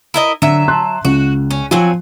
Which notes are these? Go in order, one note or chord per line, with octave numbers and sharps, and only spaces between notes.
E4 A#4 D#5
D3 F#3 E5
A5 C6 F#6
C#2 F#4
C#4
F3 F#3 C4 G#5